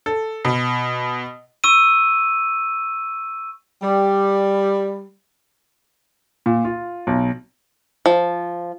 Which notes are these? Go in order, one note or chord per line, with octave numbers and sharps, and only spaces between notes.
A4
B2
C#6 E6 D#7
G3
A#2
F4
B1
F3